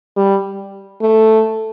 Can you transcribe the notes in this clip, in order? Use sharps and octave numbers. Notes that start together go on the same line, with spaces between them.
G3
A3